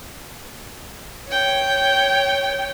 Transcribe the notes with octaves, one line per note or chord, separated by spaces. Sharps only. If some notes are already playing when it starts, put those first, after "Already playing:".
C#5 G5